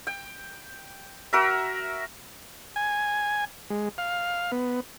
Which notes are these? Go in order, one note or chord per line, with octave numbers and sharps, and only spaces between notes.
G5
F#4 A#4 E5
G#5
G#3
F5
B3